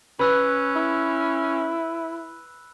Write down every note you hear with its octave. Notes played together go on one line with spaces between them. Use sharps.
C#4 B4 B5 E6 F#6
E4